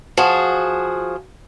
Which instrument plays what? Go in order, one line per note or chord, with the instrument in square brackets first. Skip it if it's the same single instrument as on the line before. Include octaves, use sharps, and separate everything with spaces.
[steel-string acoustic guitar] F3 F#4 G#4